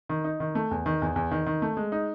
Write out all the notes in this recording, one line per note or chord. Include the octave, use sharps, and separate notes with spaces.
D#3
D#4
D#3
A3
E2
D#3
E2
E2
D#3
D#3
A3
G#3
D#4